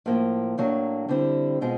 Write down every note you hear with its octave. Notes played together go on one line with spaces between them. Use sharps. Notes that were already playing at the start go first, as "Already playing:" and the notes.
A2 F3 A#3
A2 F#3 A#3 D4
D3 G3 C4 E4
B2 G#3 C4 F4 G#4